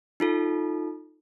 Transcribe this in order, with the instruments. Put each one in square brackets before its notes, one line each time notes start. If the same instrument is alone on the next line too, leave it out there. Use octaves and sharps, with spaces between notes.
[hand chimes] D#4 F4 A4